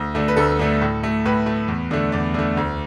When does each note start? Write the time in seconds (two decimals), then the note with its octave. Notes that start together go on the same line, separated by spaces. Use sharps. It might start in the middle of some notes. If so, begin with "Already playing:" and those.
Already playing: D2
0.15 D3 A3
0.28 B4
0.37 D2 A4
0.59 D3 A3
0.81 A2
1.03 A3
1.25 A2 B4
1.46 A3
1.68 E2
1.91 D3 A3
2.12 E2 D5
2.34 D3 A3
2.57 D2